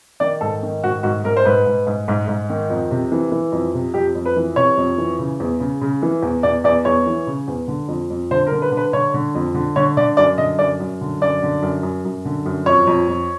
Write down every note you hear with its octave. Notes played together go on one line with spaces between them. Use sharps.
D#3 D5
G#2 A4
D#3
G#2 F#4
G#2 F#4
G#2 A#4
C5
G#2 B4
G#2
G#2
G#2
G#2
D#3
F2
C3
E3
E3
F2
C3
F2 G4
F2
B4
E3
C3 C#5
F2
E3
C#3
E2
C#3
C#3
E3
E2
E2 D5
E2 D5
E2 C#5
E3
C#3
E2
D3
F2
F2
D3 C5
A#4
D3
B4
D3
B4
D3 C#5
D3
F2
D3
D3 C#5
D3 D5
F#2 D5
D3 D#5
F#2 D5
F#2
D3
F#2 D5
D3
F#2
F#2
F#2
D3
F#2
F2 C#5
F2
F2